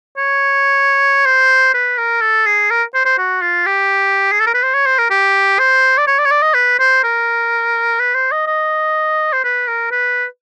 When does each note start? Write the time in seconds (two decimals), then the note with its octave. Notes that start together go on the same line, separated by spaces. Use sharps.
0.17 C#5
1.25 C5
1.74 B4
1.98 A#4
2.21 A4
2.46 G#4
2.70 A#4
2.94 C5
3.05 C5
3.18 F#4
3.41 F4
3.66 G4
4.32 G#4
4.40 A4
4.47 A#4
4.54 B4
4.63 C5
4.74 C#5
4.86 C5
4.99 A#4
5.10 G4
5.59 C5
5.98 D5
6.07 C#5
6.18 D5
6.25 C#5
6.31 D5
6.42 D#5
6.54 B4
6.79 C5
7.03 A#4
8.00 B4
8.15 C5
8.32 D#5
8.47 D#5
9.33 C5
9.44 B4
9.68 A#4
9.91 B4